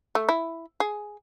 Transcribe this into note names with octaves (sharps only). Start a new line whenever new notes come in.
A3
E4
G#4